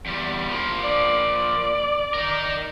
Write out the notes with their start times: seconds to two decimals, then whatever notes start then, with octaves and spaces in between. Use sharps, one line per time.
0.06 E2 G3
0.49 F3 A#3
0.83 D5
2.14 D#4 A#4